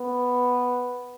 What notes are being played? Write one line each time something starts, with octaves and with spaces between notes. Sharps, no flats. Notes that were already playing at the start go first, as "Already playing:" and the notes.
Already playing: B3